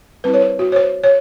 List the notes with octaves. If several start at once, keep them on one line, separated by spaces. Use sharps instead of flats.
G3 C4 E4 B4
C#5
C5
F#4
C#5
C5
C#5